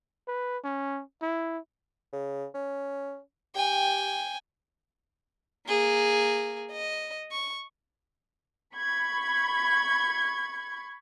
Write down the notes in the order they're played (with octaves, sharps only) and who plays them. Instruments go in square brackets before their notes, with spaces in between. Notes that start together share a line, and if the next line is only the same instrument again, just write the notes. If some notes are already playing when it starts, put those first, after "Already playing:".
[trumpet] B4
C#4
E4
[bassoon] C#3
C#4
[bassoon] G4 [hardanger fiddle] G5 G#5
[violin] A#3 G#4
D#5
C#6
[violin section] B5 C#6 G#6